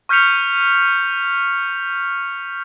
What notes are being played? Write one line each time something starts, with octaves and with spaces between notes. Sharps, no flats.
C#6 F6 G6 B6 C#7 F7